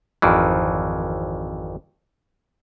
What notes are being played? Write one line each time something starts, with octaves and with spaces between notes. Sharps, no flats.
G#1 F2 D#3 E3